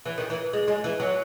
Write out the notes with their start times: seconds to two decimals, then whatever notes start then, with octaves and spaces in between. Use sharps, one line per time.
0.06 E3
0.18 D#3
0.30 E3
0.53 G#3
0.68 G#3
0.84 E3
1.00 F#3